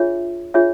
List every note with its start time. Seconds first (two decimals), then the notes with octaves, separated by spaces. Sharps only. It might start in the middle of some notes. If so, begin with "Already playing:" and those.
Already playing: D4 F4 G#4 C#5 E5
0.54 D4 F4 G#4 C#5 E5